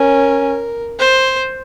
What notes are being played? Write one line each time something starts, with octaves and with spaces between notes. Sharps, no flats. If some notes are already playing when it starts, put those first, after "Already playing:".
Already playing: C#4 A#4
C5